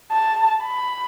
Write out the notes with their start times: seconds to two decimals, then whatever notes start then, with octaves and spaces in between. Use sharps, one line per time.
0.12 A5
0.63 B5